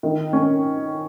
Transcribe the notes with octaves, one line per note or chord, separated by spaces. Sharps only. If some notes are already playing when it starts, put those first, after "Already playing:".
D#3
C#4